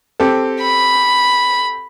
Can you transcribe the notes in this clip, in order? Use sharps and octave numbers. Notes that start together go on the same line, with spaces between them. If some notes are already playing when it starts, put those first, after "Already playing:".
C4 G4 A4
B5